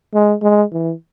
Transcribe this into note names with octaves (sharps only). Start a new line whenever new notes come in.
G#3
G#3
E3